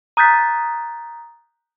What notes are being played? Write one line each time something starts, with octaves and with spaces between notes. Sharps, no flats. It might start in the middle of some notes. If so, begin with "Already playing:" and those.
A#5 D#6 F#6 G6 A6 B6